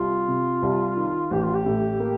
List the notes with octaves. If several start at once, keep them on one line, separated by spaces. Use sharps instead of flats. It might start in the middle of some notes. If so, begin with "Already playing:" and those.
Already playing: C2 F4
C3
C2
D#3
A1 G4
F4
G4
A2
A#3